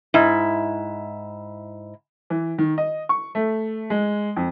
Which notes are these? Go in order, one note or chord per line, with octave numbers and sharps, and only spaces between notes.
G#2 E4
E3
D#3
D#5
C#6
A3
G#3
F2